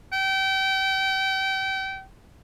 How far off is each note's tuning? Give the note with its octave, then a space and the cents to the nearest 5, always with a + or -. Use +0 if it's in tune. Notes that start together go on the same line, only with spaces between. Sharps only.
G5 -30